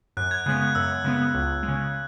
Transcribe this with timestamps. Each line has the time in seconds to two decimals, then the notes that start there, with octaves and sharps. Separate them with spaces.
0.17 F#2 F#6
0.31 G#6
0.46 C#3 G#3 B3 F#6
0.62 F#6
0.75 F#2 E6
1.04 C#3 G#3 B3
1.34 C#2
1.63 G#3
1.68 C#3